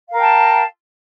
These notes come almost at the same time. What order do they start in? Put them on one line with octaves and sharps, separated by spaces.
F5 A#4 G5 A5